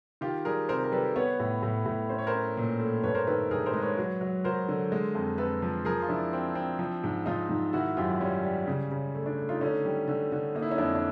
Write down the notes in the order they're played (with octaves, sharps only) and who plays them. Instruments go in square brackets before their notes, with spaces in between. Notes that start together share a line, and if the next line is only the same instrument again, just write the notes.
[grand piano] D#3 F4 G4
G3 G#4 A#4
C3 A#4 C5
A#4
G3 A4 B4
B3 B4 C#5
A2
A2
A2
C#4 C5
C#5
A#4 C5
C#4
A#2
A3
G2 B4 C#5
A#4 C5
D#3 A4 B4
G2 G#4 A#4
A#4 C5
G#3
B4 C#5
F#3
F#3
F#3 A#4 C5
D3
G#3
F2
F2 A4 B4
F3
F3 G#4 A#4
F4
F3 D4 E4
C4
C4
F3
G#2
G#2 D#4 F4
G#2
D#3 E4 F#4
F#2 F4 G4
G3 C#4
G3
C#3
C#3
A3
D4
A3
D#4 F4
D3 C#4 D#4
G3
D3
D3
A#3 D#4
E4
C#4 D#4
F2 D4 E4
D4